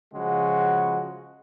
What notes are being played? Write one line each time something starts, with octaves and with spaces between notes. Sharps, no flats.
C#3 F3 G#3 F#4